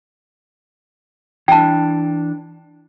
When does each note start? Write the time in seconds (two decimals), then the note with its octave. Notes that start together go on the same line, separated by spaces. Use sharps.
1.48 E3 D4 G5 A5